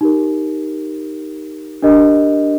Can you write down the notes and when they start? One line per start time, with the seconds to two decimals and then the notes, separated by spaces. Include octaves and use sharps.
0.01 D#4 G4 A#4
1.83 D4 G4 A#4 D#5